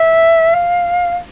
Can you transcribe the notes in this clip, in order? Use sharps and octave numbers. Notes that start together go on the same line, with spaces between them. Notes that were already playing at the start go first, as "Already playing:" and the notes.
Already playing: E5
F5